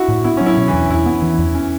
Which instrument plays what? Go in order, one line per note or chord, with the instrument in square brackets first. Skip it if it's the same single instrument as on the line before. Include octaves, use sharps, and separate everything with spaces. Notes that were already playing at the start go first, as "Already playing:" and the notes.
Already playing: [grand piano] E4 F#4
[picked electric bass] A2
[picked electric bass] B3 [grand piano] E4
[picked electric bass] F#3 [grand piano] C#4
[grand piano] E4
[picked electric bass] B2
[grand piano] E3
[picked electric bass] E2
[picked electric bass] E2 [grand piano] E4
[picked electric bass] B3
E3
E2
C#4